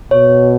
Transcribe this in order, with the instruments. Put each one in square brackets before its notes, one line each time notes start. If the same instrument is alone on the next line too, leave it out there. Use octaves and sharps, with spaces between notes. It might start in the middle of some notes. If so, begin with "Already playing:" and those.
[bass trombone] B2 [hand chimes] C#5